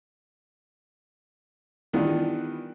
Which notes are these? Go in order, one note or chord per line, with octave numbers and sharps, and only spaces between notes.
D#3 E3 G3 B3 D4 F4